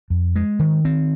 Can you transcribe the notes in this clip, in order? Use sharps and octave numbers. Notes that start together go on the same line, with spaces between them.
F2
G#3
D#3
C4